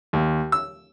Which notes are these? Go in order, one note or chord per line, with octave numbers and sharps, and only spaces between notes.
D#2
E6